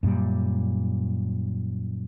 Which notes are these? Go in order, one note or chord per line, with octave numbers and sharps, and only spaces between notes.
F#2 A#2 G3